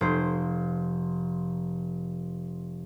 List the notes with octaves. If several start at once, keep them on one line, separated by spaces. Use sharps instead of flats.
F1 C5